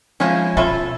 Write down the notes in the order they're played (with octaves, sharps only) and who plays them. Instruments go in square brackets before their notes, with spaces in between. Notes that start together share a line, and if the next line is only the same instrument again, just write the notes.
[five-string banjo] F3 G#3 D#4 [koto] C#4 E4
[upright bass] B2 [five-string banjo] F4 E5 B5 [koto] A4